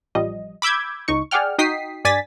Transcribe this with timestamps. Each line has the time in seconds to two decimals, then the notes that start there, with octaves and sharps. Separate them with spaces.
0.15 A1 F3 G3 D#5
0.62 B5 D6 E6 G6 G#6
1.08 C#2 D#4 C#6
1.31 G#4 D5 F#5 G5 F6
1.58 D#4 F#4 G5 D#6 B6 C7
2.05 G2 D5 G#5 A6 B6